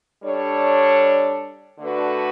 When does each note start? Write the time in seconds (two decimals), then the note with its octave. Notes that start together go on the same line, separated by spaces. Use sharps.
0.23 G3 D4 A4 C#5
1.79 D3 A3 D4 F#4 B4